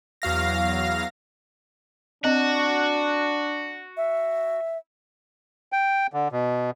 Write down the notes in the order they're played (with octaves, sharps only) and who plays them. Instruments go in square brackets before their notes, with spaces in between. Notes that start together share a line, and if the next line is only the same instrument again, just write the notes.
[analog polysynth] E2 F#3 F5 A#6
[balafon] C4 D#5 [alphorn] D4 [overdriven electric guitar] F#4
[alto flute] E5
[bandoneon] G5
D3
B2